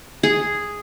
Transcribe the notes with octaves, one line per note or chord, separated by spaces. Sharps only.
G#4